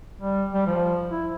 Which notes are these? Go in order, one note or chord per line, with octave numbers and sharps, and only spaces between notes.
G3
G3
F3
E4